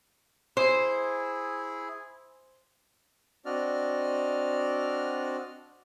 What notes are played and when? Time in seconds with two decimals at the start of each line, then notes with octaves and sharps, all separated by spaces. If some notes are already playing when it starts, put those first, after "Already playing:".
0.57 E4 G#4 C5
3.46 C4 D4 F#4 D5 D#5 F6